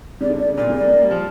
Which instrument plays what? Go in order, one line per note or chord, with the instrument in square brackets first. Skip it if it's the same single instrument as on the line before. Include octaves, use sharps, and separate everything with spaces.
[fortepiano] C#3 [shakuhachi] D5
[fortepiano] D3
[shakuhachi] D5
[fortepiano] C#3
[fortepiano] A#2 [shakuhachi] D5
[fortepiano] C#3
[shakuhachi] D5
[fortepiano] A#3
A#3
G3
F3